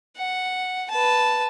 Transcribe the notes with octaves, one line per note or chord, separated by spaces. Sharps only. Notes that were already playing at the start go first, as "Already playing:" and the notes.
F#5
B4 A5